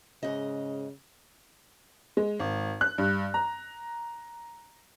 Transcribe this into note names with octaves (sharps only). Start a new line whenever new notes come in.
G#2 C#3 D#5
G#3
G#1
F#6
G2
A#5